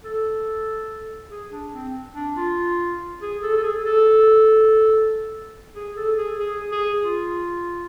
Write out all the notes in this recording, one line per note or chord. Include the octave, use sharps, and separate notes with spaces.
A4
G#4
D4
C4
D4
F4
G#4
A4
A4
G#4
A4
G#4
A4
G#4
G#4
G#4
F4